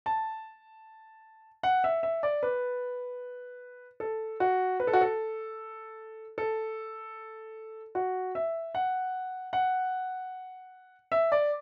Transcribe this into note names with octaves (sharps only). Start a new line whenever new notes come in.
A5
F#5
E5
E5
D5
B4
A4
F#4
B4
A4
F#4
A4
A4
F#4
E5
F#5
F#5
E5
D5